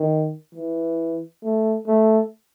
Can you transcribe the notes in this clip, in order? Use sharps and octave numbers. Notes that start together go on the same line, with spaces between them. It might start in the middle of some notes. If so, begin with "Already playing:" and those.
Already playing: D#3
E3
A3
A3